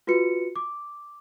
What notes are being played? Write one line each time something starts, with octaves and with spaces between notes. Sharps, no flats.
F4 F#4 B4 C#7
D6